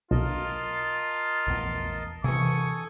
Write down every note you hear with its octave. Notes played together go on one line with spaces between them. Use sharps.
B1 F4 A#4 D#5 A5
A#1 E2
C3 E3 A4 G#5 C#6 D#6